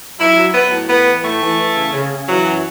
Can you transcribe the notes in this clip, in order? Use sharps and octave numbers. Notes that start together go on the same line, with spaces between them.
F#3 E4
F#3
F#3 B3
A2
A2 B3
E3
A2 A3
E3
E3
C#3
C#3
C#3
E3 F#3
F#2